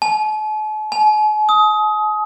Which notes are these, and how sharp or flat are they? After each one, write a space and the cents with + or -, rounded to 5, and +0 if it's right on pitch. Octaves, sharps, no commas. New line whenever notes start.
A5 -45
G#5 +45
D#6 +20